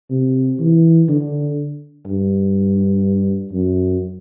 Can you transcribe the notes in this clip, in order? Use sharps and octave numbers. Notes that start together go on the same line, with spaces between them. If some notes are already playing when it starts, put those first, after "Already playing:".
C3
E3
D3
G2
F#2